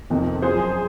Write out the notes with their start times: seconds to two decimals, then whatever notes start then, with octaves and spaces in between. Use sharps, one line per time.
0.10 F2 C3 D#3
0.42 F#2 F3 G#4 C5